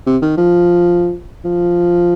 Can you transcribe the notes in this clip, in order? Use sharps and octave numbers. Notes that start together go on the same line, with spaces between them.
C3
D#3
F3
F3